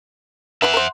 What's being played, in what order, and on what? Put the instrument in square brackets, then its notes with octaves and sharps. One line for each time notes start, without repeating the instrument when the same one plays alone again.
[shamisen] E3 E4 B4 [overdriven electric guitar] E5 F#5
[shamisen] A#4 C5